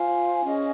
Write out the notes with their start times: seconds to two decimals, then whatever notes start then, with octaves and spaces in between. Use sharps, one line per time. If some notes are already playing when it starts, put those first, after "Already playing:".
Already playing: F4 C5 F5 G#5
0.45 C#4 G#4 D#5